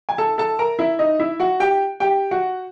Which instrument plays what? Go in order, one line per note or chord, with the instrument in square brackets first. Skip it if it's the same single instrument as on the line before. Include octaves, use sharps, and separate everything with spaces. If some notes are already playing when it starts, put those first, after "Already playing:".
[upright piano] G#5
A4 A5
A4 A5
A#4 A#5
E4 E5
D#4 D#5
E4 E5
F#4 F#5
G4 G5
G4 G5
F#4 F#5